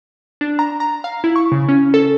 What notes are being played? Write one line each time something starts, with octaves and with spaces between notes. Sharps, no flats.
D4
A#5
A#5
F5
E4
C#6
C#3
C#4
A4